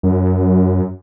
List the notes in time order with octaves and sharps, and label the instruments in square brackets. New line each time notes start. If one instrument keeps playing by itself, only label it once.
[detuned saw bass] F#2